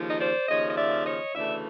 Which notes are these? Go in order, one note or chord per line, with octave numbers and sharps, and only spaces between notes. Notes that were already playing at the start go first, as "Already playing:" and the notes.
Already playing: D#2 C#3 F3
D#5
C5 D5
D#2 C#3 F3 C#5 D#5
D#5
D5 E5
C#5 D#5
D2 C#3 E3 A3 D5 E5